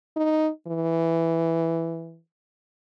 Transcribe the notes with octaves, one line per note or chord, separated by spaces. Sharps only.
D#4
E3